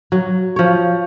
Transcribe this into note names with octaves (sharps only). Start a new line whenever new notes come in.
F#3
F3 C#5